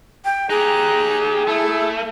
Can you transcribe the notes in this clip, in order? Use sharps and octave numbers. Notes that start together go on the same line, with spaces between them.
G5
D#4 G4 G#4 A#5 F#6
A3 E4 A4